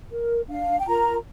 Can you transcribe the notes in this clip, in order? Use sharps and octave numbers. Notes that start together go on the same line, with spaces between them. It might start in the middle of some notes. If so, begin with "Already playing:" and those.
A#4
D4 F5
G5
F4 A#4 A#5